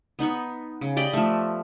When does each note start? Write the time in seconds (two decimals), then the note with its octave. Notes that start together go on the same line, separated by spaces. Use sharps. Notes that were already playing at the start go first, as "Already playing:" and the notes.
0.19 B3 D#4 B5 C#6
0.81 C#3
0.96 G4 D5 D#5 B5
1.13 F3 A3